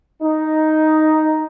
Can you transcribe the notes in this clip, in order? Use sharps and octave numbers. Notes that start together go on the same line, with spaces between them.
D#4